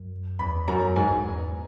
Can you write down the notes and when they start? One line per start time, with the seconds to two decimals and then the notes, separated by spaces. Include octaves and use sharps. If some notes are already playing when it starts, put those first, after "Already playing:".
Already playing: F#2
0.39 E2 B5
0.68 F#2 A#5
0.96 G#2 G#5
1.10 G#2
1.23 E2